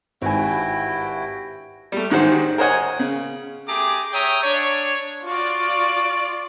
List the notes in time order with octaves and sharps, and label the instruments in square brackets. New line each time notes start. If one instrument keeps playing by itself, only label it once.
[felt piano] G#1 G#5 [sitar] G2 [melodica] E4 F#4 G5
[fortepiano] G3 A3
A1 G#2 D#3 F#4 G4 C5
A#4 C5 C#5 D#5 F#5 G#5
C#3
[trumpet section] A3 G4 G#4 A#5 D6
C#5 E5 G5 A#5 D#6
D4 C#5
[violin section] F4 D5 [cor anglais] F#4